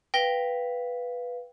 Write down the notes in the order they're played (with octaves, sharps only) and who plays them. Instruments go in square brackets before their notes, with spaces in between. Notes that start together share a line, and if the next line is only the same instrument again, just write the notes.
[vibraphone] B4 F5 [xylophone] G5 A#6 G7